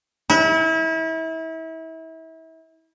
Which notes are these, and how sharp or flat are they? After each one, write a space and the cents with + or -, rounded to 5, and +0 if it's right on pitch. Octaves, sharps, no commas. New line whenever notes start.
E4 -30